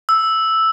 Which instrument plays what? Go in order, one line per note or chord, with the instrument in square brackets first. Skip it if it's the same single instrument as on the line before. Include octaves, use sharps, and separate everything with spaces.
[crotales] E6